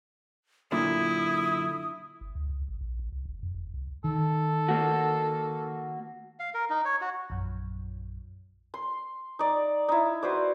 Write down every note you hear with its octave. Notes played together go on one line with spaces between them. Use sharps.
F#2 A#2 D3 E4 D#6
F#1
D2
C#2
G#1
A#1
A1
C2
F1
F2
F1
C2
D#3 A4
A#3 F#4
F5
A#4
D#4
C#5
F#4
A#1 F#2
C6
D#4 D5
D#4 E4
F#4 B4 C5 D5